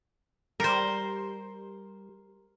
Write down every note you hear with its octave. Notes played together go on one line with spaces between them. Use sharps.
G3 A#4 C5